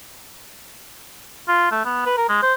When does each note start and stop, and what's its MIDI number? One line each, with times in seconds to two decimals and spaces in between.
1.48 1.69 65
1.72 1.82 57
1.85 2.03 59
2.06 2.13 71
2.17 2.29 70
2.29 2.42 56
2.42 2.54 72